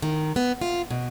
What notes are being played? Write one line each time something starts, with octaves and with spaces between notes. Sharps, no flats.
D#3
B3
F4
B2